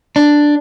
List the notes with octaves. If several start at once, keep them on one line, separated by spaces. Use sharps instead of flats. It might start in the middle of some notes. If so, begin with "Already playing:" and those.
D4